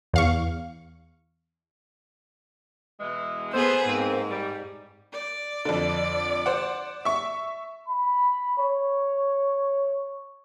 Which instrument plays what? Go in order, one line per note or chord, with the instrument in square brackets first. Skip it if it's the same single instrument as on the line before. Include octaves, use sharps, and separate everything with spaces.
[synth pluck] E2 F5 C#6
[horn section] B2 E3 G#3
[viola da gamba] B3 G#4 B4 [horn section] A4 C5
[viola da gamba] G#2 [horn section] A#3 C4
[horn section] G3
[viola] D5
[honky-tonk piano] F2 D3
C5 F#5
E5 C#6
[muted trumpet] B5
C#5